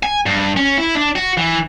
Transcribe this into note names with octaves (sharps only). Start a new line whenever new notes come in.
G#5
G2
C#4
E4
D4
F#4
E3